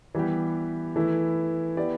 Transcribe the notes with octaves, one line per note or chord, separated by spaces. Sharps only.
E3 G3 B3 E4 G4
E3 A3 E4
B3 E4 G4 D5